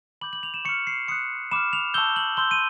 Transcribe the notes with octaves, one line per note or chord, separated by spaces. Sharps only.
B5 D6 G6 F#7
F#7
F7
E7
C#6 F6 C#7
C7
C6 D#6 F#6 C#7
B5 D6 F6 E7
F7
A5 C#6 E6 G6 G7
F#7
C6 E6 G6 G7
D#7